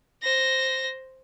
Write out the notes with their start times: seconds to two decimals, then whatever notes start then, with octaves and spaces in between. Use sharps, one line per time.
0.23 C5 A#6